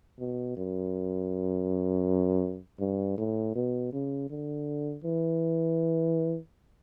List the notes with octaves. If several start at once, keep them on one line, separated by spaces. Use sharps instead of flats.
B2
F#2
G2
A2
B2
C#3
D3
E3